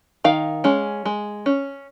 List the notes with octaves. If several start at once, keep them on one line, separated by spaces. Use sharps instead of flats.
D#3 F5
G#3 C#4
G#3
C#4